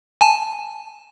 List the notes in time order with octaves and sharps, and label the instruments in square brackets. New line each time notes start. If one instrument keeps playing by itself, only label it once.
[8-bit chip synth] G#5 A5